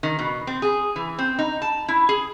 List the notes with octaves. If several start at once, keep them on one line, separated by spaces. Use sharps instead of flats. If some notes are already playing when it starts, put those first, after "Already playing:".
D#3
B2
C4
G#4
E3
C4
D#4
A5
E4
G#4